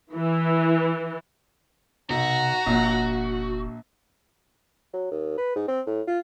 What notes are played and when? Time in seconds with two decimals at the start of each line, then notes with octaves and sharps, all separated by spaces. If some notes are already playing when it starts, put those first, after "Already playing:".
0.14 E3
2.10 B1 C3 F#4 A#5
2.66 F1 A#1 A#2
4.94 F#3
5.11 D#2
5.38 B4
5.56 G#2
5.68 C4
5.87 A2
6.08 F4